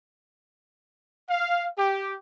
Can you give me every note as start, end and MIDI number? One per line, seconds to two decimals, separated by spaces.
1.30 1.68 77
1.78 2.15 67